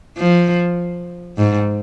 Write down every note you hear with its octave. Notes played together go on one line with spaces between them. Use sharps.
F3
G#2